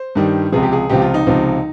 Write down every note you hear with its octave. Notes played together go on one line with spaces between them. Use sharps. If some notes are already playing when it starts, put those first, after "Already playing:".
Already playing: C5
G2 D#3 G3
C#2 C3 F3 G#4
G4
G#4
C#2 C3 F3 G4
F4
D#4
C#2 C3 F3